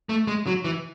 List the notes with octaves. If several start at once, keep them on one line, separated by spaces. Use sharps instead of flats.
A3
G#3
F#3
E3